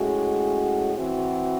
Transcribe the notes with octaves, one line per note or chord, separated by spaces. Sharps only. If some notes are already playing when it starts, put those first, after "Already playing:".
Already playing: A2 G#3 C#4 F#4
E3 C4 F#4